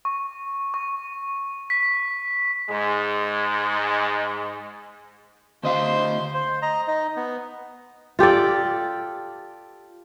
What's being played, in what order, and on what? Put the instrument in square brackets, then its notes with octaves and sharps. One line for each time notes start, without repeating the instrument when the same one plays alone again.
[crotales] C#6
C#6
B6
[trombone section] G#2 G#3
[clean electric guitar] D2 D#5 F5 [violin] C5
[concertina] C5
D#5 A#5
D#4 D#5
B3
[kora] F4 G4 A4 D5